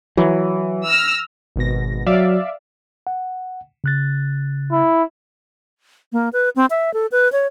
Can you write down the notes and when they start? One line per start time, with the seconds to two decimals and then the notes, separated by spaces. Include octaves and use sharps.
0.17 E3 F#3
0.85 E6 F6 A#6
1.56 G#1 B2 A#6
2.06 F#3 D5 E5 F5
3.07 F#5
3.84 C#3 F#6 A6
4.72 E4
6.12 A#3
6.33 B4
6.56 C4
6.70 E5
6.94 A4
7.12 B4
7.32 C#5